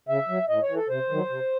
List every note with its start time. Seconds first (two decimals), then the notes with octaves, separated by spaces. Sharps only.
0.09 C#3 E5
0.29 F#3
0.49 A2 D#5
0.62 C#5
0.69 E3
0.76 A4
0.89 C3 C5
1.10 D#3 F#3
1.30 C3